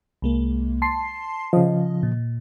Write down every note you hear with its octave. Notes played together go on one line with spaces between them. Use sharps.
C2 G#3 A#3
A5 C6 C7
C#3 F3 D#5
A#2